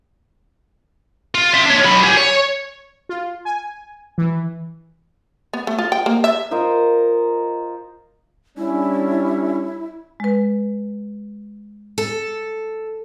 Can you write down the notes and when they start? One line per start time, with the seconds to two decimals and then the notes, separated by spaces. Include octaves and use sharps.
1.35 F4
1.54 E5 C6
1.66 D4 C#5
1.85 F#3 B5
2.03 G4 G#4
2.17 C#5
3.09 F4
3.45 G#5
4.18 E3
5.53 B3
5.67 A3
5.78 F4
5.92 G5
6.06 A#3
6.24 E5
6.51 F4 A#4 C5 D#5
8.58 G3 C#4 D4 E4
10.20 G#3 B4
11.98 A4